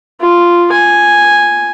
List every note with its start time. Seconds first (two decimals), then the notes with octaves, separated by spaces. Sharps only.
0.21 F4
0.72 G#5